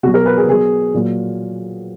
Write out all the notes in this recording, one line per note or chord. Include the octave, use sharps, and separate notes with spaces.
B2 F#3 F#4
A#4
B4
G#4
B2 F#3 G#4
A#2 F#3